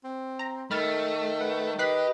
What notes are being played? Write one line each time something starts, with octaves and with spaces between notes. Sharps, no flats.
C4
A#5
D#3 A3 B5 F6 A6
B4 F#5
G4 B4 D#5 F#6 B6 C7